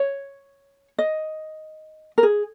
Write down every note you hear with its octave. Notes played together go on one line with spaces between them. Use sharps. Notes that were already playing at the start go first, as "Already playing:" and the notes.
Already playing: C#5
D#5
A#4
G#4